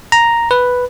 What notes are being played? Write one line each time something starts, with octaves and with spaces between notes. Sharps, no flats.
A#5
B4